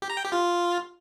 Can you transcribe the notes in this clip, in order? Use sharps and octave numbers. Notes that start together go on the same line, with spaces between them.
G4
A#5
G5
G4
F4